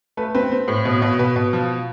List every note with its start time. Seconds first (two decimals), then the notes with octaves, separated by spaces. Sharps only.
0.17 A3 B4
0.35 C4 B4
0.52 C4
0.68 A2
0.85 B2
1.02 B2
1.19 B2 B4
1.36 B2
1.53 F3